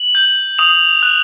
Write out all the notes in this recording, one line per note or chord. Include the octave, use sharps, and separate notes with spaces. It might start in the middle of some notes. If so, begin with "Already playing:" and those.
Already playing: F#7
G6
D#6 F7
F#6